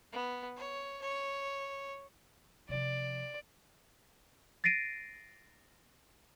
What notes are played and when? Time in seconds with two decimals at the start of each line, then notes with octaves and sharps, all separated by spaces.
0.12 B3
0.57 C#5
1.02 C#5
2.69 C3 F3 D5
4.64 A6 A#6 C7 D7 D#7